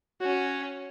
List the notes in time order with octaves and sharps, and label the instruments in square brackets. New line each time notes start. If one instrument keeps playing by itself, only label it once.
[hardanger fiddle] C#4 [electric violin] F#4